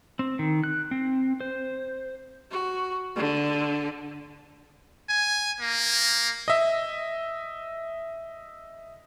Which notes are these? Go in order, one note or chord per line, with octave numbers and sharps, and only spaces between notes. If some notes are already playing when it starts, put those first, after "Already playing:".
C4
D#3
F#6
C4
C5
F#4
D3
G#5
A#3
D#5 E5